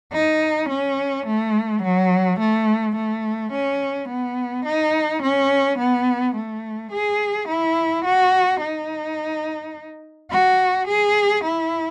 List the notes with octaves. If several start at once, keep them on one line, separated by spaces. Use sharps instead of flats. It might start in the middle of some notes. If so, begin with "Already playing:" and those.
D#4
C#4
A3
F#3
A3
A3
C#4
B3
D#4
C#4
B3
A3
G#4
E4
F#4
D#4
F#4
G#4
E4